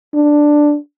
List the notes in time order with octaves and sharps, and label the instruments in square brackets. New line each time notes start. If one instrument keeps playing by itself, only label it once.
[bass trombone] D4